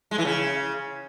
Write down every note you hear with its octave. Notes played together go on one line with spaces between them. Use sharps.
G#3
E3
C#3